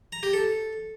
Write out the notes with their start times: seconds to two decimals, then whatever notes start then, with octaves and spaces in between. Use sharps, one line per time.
0.12 A#5
0.23 G4
0.33 A4